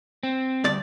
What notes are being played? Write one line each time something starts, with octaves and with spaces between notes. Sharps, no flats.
C4
D2 G2 D5